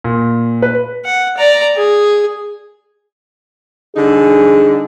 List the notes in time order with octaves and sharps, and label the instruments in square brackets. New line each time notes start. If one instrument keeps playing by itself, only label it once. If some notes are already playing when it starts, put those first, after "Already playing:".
[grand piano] A#2
B4
[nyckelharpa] F#5
D5 A#5
G#4
[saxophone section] D3 G3 D#4 [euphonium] G#4